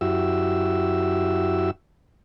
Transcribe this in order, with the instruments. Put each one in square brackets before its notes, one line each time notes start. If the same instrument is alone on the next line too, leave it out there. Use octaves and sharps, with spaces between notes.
[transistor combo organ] F#2 E4 F#4 G4 E6